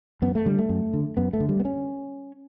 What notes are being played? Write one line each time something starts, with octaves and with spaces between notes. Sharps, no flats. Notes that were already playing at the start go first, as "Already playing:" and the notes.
F#2 B3
A3
D3 G3
A3
F#2
D3
F#2 B3
A3
D3
G3
B3
C#4